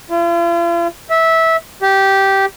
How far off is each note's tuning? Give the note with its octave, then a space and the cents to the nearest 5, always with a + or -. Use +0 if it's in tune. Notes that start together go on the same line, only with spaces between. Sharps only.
F4 -45
E5 -15
G4 -10